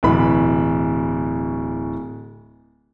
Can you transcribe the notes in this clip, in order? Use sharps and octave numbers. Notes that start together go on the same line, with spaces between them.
D1 B2 E3 B5